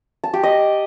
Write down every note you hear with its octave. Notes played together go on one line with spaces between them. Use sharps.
A5
G4
D#5